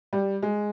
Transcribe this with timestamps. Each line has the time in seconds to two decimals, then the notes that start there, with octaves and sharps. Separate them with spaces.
0.13 G3
0.43 G#3